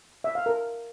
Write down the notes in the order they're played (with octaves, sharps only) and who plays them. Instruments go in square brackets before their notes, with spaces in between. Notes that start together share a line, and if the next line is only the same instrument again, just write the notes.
[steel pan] E5
F5
A#4